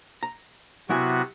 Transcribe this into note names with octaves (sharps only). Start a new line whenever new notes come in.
A#5
C3 F#3 B3 E4 F#4 G#5